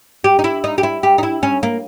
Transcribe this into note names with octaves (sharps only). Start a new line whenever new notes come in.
G4
D#4
E4
D#4
G4
E4
G4
D#4
E4
C#4
A#3